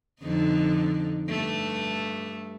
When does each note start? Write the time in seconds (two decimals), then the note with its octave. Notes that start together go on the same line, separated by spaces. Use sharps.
0.21 F2 D3 D#4
1.29 G2 A3